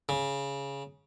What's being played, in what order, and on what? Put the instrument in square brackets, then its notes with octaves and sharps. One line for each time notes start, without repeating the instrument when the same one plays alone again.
[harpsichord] C#3